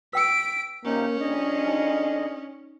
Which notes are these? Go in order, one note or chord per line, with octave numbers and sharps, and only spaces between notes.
B4 G5 E6 B6 D7
C3 F3 A#3 C#4 D#4
F2 D4 G#4 D#5
D#4